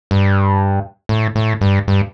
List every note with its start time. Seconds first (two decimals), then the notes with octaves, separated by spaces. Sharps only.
0.11 G2
1.09 A2
1.35 A2
1.61 G2
1.88 G2